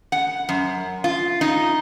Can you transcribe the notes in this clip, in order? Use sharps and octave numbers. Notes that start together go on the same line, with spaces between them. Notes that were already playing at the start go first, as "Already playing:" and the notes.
F#5
F#2
F4
D#4